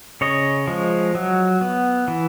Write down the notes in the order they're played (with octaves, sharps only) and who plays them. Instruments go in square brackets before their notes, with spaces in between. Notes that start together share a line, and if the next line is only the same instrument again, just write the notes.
[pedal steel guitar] C#3 C#5 D#5
F3 G#3
F#3
B3
E3